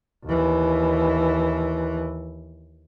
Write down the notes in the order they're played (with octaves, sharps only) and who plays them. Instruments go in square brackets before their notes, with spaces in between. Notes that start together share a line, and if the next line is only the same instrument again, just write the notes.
[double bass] D#2 E3